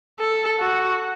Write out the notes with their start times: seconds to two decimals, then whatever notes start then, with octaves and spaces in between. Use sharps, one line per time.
0.19 A4
0.60 F#4